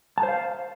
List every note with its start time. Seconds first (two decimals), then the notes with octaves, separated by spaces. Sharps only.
0.18 A5
0.23 C5
0.29 F5